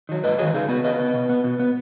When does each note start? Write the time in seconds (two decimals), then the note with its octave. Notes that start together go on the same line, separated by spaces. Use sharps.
0.09 D#3 F#3
0.24 G#2 B4 D#5
0.39 D#3 F#3 G#4 C#5
0.47 B4
0.53 C#3 D#4 G#4
0.69 B3 F#4 B4
0.84 C#3 B4 D#5
0.99 B3
1.14 B2
1.29 B3
1.44 B2
1.60 B3